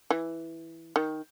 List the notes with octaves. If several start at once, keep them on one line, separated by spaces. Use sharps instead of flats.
E3
D#3